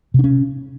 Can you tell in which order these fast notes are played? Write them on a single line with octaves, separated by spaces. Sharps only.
C3 D4 C#4